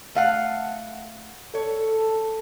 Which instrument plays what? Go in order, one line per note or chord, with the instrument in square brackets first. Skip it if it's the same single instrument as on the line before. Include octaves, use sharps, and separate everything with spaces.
[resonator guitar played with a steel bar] A3 F5 F#5
[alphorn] A4 [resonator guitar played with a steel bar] C#5